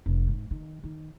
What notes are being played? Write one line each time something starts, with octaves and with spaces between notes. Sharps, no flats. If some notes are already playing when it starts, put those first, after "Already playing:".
F1
G#2
D#3
D#3